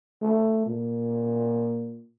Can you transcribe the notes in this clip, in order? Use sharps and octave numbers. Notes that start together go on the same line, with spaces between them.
A3
A#2